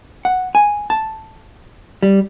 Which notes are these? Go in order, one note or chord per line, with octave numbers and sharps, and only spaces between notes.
F#5
G#5
A5
G3